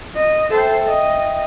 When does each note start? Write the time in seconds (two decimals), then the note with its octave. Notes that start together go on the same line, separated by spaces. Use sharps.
0.16 D#5
0.50 A4 C5 E5 G5
0.88 D#5